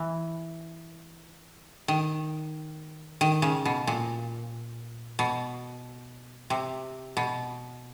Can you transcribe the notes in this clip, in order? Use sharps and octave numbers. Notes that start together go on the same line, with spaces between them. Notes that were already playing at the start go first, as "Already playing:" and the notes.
Already playing: E3
D#3
D#3
C#3
B2
A#2
B2
C3
B2